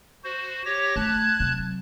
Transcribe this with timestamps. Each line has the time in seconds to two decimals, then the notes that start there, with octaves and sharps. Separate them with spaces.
0.24 F#4 C5
0.65 G4 C#5 A#6
0.96 A3 A5 F#6 G#6
1.40 C3 F#3